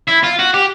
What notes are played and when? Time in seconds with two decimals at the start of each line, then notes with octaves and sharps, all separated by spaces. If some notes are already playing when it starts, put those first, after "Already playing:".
0.08 E4
0.24 F4
0.39 F#4
0.54 G4